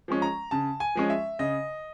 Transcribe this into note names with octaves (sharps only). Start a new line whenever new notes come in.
F3 G#3 C#4
A#5
C#3 A5
G#5
F3 G#3 C#4
E5
C#3 D#5